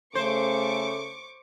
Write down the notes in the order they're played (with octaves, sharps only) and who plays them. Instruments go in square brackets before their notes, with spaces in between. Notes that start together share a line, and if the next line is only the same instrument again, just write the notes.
[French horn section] C#3 A3 [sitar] C5 [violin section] C#6 D6